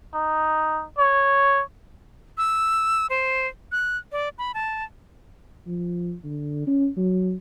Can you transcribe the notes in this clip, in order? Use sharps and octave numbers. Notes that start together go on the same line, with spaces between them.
D#4
C#5
E6
C5
F#6
D5
B5
A5
F3
D3
C#4
F#3